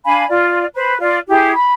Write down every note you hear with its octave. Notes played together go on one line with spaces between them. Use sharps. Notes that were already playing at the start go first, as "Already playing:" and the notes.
D4 F5 G#5 B5
F4 D5
B4 C5 B5
F4 D5
E4 G4 G#4
B5